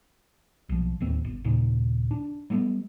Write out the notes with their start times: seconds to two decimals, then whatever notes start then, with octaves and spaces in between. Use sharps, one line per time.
0.69 B1 F3
1.00 D1 D#2 C4
1.25 G1
1.44 D#2 A#2 C#3
2.11 D4
2.50 F#3 G3 A3 B3